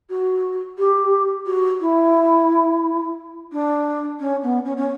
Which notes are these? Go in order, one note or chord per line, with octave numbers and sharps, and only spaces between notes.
F#4
G4
F#4
E4
D4
C#4
B3
C#4
C#4